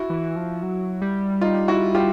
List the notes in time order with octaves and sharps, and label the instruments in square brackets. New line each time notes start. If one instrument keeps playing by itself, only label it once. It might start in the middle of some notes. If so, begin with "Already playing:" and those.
Already playing: [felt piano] E4 F#4
[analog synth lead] E3
F3
F#3
G3
[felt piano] D#4 F4
E4 F#4
F4 G4